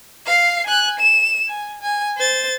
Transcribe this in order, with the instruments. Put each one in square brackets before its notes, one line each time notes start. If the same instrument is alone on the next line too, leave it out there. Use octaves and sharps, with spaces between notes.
[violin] F5 C7
G#5 F#6
E7
G#5
G#5
C5 A6